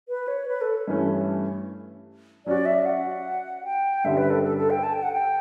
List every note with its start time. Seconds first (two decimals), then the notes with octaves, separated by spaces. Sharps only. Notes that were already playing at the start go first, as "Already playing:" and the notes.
0.09 B4
0.28 C#5
0.48 B4
0.61 A4
0.88 G2 E3 A3 C#4
2.46 F#3 C#4 F#4 D5
2.66 E5
2.85 F#5
3.65 G5
4.04 G2 D3 G3 C#4 E5
4.17 B4
4.30 A4
4.44 A4
4.57 A4
4.70 G5
4.83 A5
4.93 G5
5.03 F#5
5.13 G5